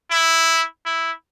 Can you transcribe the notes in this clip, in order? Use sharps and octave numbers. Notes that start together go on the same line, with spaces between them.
E4
E4